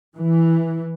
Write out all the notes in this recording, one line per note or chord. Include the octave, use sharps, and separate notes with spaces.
E3